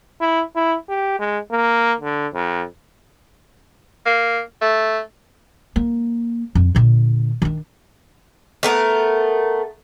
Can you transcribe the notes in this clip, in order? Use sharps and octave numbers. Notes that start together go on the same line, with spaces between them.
E4
E4
G4
G#3
A#3
D3
F2
A#3
A3
A#3
F2
A#2 D3
D#3 D4
A3 B3 A#4